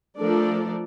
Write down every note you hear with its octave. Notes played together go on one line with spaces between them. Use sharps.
F3 A3 D4 A4 A#4 D5